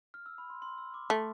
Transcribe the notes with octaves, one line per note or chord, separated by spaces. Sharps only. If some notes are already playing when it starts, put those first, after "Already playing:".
F6
E6
B5
C6
C6
E6
D6
A3 C6